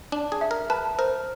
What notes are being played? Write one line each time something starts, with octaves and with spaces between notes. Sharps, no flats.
D4 A5
G#4
E5
A#4
B4 A5
A#4 C5